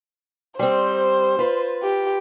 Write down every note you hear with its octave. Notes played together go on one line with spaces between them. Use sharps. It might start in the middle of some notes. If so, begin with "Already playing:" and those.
G3 C4 C5
F4 B4
G4